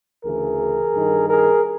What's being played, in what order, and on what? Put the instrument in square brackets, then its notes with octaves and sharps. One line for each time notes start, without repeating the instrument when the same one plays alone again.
[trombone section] D2 C#3 E3 G#4 A#4
G2 D#3
G#4 A#4